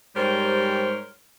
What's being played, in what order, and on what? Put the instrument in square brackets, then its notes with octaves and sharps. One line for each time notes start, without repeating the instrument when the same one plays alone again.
[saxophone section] G#2 G3 G4 A#4 C5 C#5